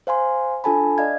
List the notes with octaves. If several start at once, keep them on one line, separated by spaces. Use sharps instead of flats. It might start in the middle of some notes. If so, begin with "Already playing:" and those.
C5 F5 G#5 C6
D4 F4 A4 G#5 A5 B5
D5 D#5 F5 G#6